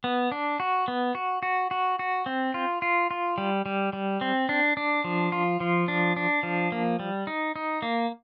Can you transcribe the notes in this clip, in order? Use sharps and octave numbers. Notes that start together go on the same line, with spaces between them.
B3
D4
F#4
B3
F#4
F#4
F#4
F#4
C4
F4
F4
F4
G3
G3
G3
C4
D4
D4
F3
F4
F3
D4
D4
F3
A#3
G3
D#4
D#4
A#3